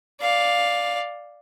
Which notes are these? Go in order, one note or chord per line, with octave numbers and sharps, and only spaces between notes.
D5 F5